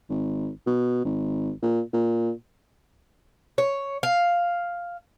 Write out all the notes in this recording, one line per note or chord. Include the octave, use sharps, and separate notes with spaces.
G#1
B2
G#1
A#2
A#2
C#5
F5